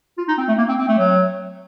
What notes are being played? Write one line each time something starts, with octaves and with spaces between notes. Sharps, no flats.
F4
D#4
C4
A3
A#3
C4
C4
A3
F#3